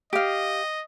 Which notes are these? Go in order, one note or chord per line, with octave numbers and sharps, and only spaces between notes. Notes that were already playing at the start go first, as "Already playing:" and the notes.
G4 D#5 F5